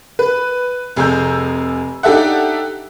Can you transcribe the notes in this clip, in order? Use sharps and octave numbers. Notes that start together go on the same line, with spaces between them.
B4
F1 C3 G#4 A#5 E6 G6
D4 D#4 G4 A4 E5 F#5